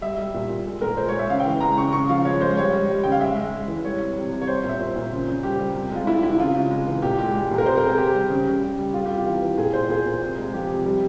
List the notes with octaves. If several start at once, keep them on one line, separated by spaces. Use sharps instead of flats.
G3 E5
G3
A#2
A#2
G#3
A#2 A#4
G#3 C5
C#5
G#3
E5
C#3 F5
G5
E3
G#3 A#5
C#3 C#6
C#3 C#6
F3 F5
G#3 C#5
G#3 C5
G3 C#5
G3
G3
C#3 G5
F5
G#3 E5
G#3
G#3
E3
G3 C#5
C3
C3
C3
C#5
G3 C5
A#2
E5
A#2 C5
A#2
C#3
C#3
G3 G4
G3
C3
G#3 F4
G#3 E4
C3 E4
C#3 F4
C#3
G#3
E3
A#2 G4
G#3 G4
G#3
A#2
A#4
C3 C5
C3 A#4
G#4
C3 G4
G3
C#3
C#3
G3
G3
G3 F4
C3 G4
F4
E3
E3
A#2 G#4
A#2 C5
A#2 G#4
A#2
C3
G#3
F3 G4
C3
G3